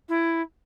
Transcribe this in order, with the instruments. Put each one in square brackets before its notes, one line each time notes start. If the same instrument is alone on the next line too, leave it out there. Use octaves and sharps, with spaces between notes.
[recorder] E4